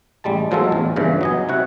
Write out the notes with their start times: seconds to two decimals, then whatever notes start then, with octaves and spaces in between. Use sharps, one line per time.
0.24 A1 G3 G#3 A5
0.51 A#2 F3 F#3 G#3 F4 A4
0.72 A1 E2
0.96 E2 G2 A#2 C#3 E3
1.21 F#3 D#5 G#5
1.49 C3 E4 F#4 F#5